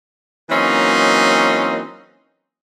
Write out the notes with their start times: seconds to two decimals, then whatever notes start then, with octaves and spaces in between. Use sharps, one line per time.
0.50 E3 F#3 A#3 C4 C#4 D#4